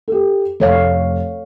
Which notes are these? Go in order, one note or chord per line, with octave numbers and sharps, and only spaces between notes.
G4 A4
F1 A3 C#5 F5